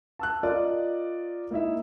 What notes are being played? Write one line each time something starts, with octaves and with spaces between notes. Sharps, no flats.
A5 E6 F#6
F4 A#4 D5 D#5
A#3 D#4 E4 E5